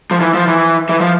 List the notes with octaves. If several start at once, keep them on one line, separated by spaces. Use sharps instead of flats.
F3
E3
F3
E3
E3
F3